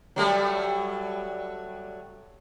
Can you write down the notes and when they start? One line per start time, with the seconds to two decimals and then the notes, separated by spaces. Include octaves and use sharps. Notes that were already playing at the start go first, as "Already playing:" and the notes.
0.16 F#3 G3 A3